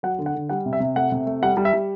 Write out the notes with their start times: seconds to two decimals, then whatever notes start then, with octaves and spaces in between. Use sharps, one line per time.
0.03 F#3 F#5
0.18 D3
0.26 F#5
0.35 D3
0.49 G3 F#5
0.66 C3
0.73 E5
0.80 C3
0.96 A3 F#5
1.12 C3
1.27 A3
1.43 G3 F#5
1.57 G3
1.65 E5
1.73 G3